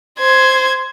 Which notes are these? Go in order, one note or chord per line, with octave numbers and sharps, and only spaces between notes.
C5 G#6